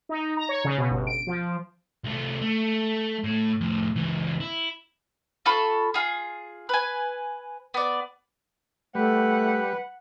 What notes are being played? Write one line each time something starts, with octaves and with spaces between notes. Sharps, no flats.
D#4
A#5
C#5
C#3
B2
G1
D7
F3
C2 A3
A3
A2
F2 A2
C#2 E3
E4
F4 A4 B5 C#6
F4 G#4
B4 G#5
B3 D5
G3 A3 B4 F#5